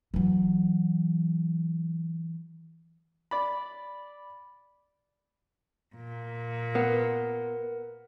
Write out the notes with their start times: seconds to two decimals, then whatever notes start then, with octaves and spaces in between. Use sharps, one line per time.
0.14 E3 F#3
3.31 D5 B5
5.95 A#2
6.75 B3 A#4 B4 F#5